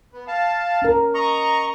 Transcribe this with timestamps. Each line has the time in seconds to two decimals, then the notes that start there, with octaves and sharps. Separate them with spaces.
0.13 B3
0.27 F5 A5
0.82 C#4 A#4
1.14 D#5 A#5 C#6